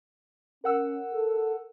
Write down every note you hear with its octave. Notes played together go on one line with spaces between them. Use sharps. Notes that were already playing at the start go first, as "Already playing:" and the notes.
C#4 A#4 F#5 E6
A4